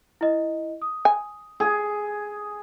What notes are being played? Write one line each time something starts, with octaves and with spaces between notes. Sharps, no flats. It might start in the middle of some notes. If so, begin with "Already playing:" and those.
E4 D#5
D#6
G#5
G#4